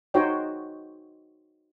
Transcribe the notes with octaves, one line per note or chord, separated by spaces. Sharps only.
D#4 F#4 C5 C#5 D#5 G5